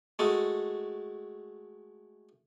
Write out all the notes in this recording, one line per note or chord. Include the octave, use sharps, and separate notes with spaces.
G#3 A3 F#4